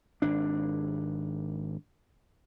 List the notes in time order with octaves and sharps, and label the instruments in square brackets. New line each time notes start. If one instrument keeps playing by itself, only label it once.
[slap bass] G#1 D4